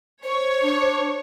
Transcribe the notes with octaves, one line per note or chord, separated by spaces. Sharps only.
C5 C#5
D4